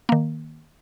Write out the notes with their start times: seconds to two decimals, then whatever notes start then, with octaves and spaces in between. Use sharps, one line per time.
0.09 D#3 A#3